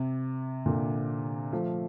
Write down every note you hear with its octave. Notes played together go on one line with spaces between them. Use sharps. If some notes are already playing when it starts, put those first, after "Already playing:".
Already playing: C3
A#2 D3
F3 A3